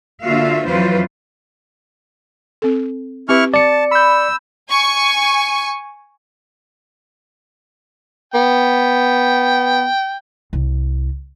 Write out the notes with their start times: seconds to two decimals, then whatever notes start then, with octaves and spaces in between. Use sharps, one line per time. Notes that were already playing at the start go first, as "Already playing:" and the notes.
0.22 D3 A#3 F4 F#4 E5 F5
0.66 F2 E3 F#3 F4 B4 C5
2.62 C4 A4
3.29 C4 E4 G4 B4 C#6 F6
3.54 D5 A5 C#7
3.91 B5 E6 G6
4.70 G#5 C#6
8.34 B3 G5
10.53 C2